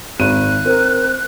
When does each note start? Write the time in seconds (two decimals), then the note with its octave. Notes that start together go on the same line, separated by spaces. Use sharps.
0.20 G#1 F#6 D#7
0.66 C4 A#4